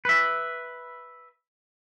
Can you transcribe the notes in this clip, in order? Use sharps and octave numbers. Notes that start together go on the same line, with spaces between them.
B4 E5